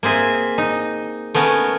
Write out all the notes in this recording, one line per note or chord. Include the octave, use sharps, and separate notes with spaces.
A#3 C4 G#4 E5
D#4
A3 B3 C#4 A#4